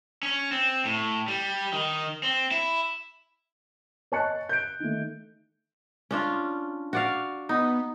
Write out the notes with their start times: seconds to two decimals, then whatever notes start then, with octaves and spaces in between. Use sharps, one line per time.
0.23 C#4
0.52 C4
0.85 A2
1.28 G3
1.73 D#3
2.23 C4
2.51 E4
4.12 C#5 D#5 A5 C#6 F#6 C#7
4.49 G6 D7
4.80 D#3 A3
6.11 C#4 D4 F4
6.93 F#4 D5 F5
7.49 B3 D#4